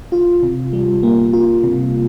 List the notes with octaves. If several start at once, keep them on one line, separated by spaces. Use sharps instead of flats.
F4
C3
G3
A#3
F4
C3